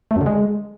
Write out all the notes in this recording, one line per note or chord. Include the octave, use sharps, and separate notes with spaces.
A3
F#2
D3
G#3